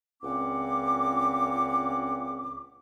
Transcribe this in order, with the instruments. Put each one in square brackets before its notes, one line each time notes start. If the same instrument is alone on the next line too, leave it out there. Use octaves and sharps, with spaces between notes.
[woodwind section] C#2 A#2 C4 C#4 F#5 D6